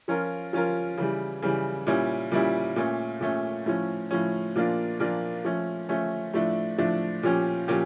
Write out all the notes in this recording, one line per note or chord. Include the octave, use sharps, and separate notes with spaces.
F3 C#4 F4 A#4
F3 C#4 F4 A#4
C#3 E3 G3
C#3 E3 G3
A#2 G3 C#4 E4
A#2 G3 C#4 E4
A#2 A3 C#4
A#2 A3 C#4
A2 F3 C#4
A2 F3 C#4
A#2 F3 A#3 D4 F4
A#2 F3 A#3 D4 F4
F3 A3 C#4
F3 A3 C#4
A2 F3 A3 D4
A2 F3 A3 D4
A#2 F3 C#4 G4
A#2 F3 C#4 G4